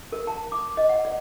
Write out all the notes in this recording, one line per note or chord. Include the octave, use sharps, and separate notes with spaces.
A#4
A5
D6
D#5
F#5
D5